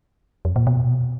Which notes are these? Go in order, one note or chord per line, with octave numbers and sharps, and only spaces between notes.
F2
A#2
B2